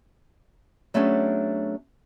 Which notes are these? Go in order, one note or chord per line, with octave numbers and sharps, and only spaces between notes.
F#3 A3 B3 C#4 D4 G#4